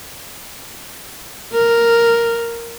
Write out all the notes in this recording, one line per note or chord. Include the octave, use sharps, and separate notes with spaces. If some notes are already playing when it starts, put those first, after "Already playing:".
A#4